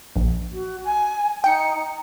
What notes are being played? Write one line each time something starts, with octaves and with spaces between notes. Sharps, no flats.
A#1
F#4
G#5
D#4 G5 C#7